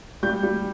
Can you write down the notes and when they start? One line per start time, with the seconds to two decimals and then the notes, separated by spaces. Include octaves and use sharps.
0.23 G3 G6
0.43 G3